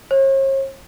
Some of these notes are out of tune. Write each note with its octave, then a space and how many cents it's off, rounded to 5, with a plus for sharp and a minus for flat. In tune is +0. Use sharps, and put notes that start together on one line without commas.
C#5 -45